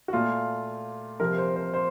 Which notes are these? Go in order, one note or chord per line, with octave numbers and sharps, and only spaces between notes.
F#4
A#2 A3 F4
C2 C3 F3 A#4
C5
C5
C5